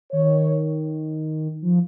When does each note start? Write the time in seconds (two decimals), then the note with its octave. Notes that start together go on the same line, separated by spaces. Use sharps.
0.12 D#3 C#5
1.62 F3